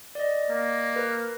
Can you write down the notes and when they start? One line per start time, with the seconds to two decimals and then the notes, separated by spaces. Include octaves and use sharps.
0.15 D5 D#5
0.50 A#3
0.96 A#4 B4